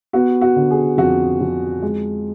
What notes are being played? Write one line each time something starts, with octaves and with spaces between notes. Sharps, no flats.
B3 F#4
F#4
D3
G#4
F2 F#4
F2
G#3